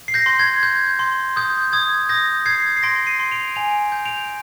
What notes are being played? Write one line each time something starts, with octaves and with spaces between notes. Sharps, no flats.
C7
G6 A#6
C6
G#6
G6
C6
D#6 G6
D#6 G#6
D#6 G6 A#6
G6 G#6 C7
C7
C6 A#6 D7
C7 D#7
C6
D7 F7
G#5 D7 F7
G6
D7 F7